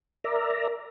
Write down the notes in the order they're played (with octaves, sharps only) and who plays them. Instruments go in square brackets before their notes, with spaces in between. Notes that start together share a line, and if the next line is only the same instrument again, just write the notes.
[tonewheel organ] A#4 D5 E5 A#5